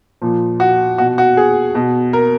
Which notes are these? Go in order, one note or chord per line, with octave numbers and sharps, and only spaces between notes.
A#2 F3
F#4
B2 F#4
F#4
G#4
B2
A#4